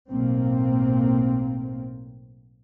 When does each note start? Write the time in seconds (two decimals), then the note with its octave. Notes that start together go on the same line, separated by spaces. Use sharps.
0.11 B1 A2 A#3 C4